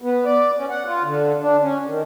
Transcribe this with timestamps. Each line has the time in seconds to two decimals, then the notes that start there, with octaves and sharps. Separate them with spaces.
0.02 B3
0.25 D5
0.58 C#4
0.70 F#5
0.86 F4
1.03 D3
1.41 D4
1.62 C#4
1.87 D#3